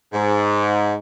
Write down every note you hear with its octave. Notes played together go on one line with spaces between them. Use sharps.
G#2